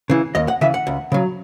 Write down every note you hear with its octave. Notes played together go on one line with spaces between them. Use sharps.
C#3 E3
D#2 D#5
F#5
C#3 E3 E5
F#5
C#2
C#3 F#3